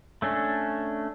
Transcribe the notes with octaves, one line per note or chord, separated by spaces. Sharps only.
A3 C#4 D4